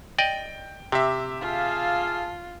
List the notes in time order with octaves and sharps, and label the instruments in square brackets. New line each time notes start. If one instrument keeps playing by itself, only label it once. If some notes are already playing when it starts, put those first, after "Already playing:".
[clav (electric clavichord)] D5 D#5 [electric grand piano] G5
[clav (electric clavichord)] C3 [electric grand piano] G4 E5
[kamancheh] F4 [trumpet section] G#4 F5 A5